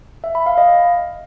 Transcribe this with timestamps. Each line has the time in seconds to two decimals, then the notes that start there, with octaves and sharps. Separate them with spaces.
0.24 E5
0.35 B5
0.46 F5
0.58 D#5